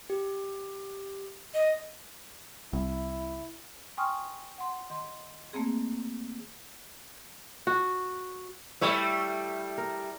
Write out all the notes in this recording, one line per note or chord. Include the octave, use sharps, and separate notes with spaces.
G4
D#5
C2 E4
G5 G#5 C6 C#6 D#6 F6
F#5 C6
D#3 C6
A3 A#3 C4 G#4
F#4
G3 A3 E4 C#5 E5
A#4